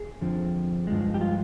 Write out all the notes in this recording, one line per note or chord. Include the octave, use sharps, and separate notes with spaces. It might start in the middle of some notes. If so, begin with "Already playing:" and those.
Already playing: G#4
F2 D3 F3 C4
G2 F3 G#3
G4
F4